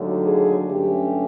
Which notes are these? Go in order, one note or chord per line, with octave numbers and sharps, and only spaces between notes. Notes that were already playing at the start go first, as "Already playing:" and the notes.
Already playing: D#2 D3 F#3 A3
G#4
G2 D3 F#3 A3 C#4 G4